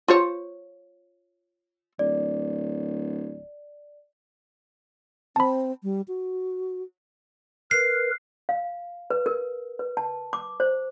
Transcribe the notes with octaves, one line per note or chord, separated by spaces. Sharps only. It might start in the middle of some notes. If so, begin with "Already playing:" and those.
F4 C5 C#5
D1 D5
C4 A5 B5
G3
F#4
A#4 B4 C7
F5
B4
A#4
B4
A5
D6
C5